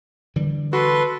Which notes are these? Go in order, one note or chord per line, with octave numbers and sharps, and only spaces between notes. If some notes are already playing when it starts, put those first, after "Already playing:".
D3 E3 G3
F#4 A4 B4 C6